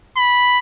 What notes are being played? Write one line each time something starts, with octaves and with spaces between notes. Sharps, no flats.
B5